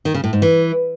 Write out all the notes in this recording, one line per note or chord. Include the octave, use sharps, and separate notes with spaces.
D#3
C#3
A2
G#2
E3